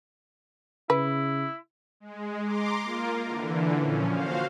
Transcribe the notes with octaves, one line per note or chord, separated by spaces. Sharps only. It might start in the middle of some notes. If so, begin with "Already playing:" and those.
C#3 E4 B4
G#3
A#5 C6 D6
A#3 F4 A#4
D3 E3
A#2 F3 C#4
F#4 C5 F5